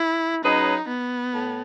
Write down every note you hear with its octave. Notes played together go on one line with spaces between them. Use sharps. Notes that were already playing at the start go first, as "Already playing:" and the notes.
Already playing: E4
F#3 C#4 D#4 G#4 B4 D#5
B3
A2